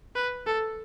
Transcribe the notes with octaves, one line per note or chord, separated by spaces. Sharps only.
B4
A4